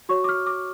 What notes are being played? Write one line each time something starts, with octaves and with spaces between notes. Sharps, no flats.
F#4 C#5 C#6
D6
F6
D6